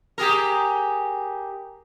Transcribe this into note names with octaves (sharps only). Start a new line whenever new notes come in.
G4 G#4 A#4